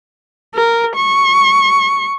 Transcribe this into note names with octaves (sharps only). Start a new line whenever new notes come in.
A#4
C#6